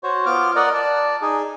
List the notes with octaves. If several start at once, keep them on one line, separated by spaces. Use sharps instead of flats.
F#4 C5 C#5
B3 F4 D6 F6
A#4 D5 D#5 F#5
D5 A5
D#4 G#4